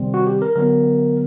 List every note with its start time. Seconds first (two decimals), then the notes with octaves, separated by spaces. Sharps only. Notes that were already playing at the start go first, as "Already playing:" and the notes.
Already playing: C3 D#3 G3 C4
0.14 F#4
0.27 G4
0.42 A#4
0.56 D3 F#3 B3 A#4